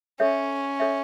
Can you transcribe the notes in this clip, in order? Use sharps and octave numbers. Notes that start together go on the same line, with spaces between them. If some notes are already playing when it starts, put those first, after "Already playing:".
C#4 A4 C#5 E5
A4 C#5 E5